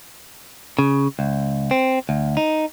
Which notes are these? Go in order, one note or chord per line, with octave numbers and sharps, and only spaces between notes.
C#3
C#2
C4
D2
D#4